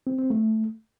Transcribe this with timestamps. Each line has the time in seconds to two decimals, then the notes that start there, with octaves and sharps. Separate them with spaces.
0.07 C4
0.18 C4
0.30 A3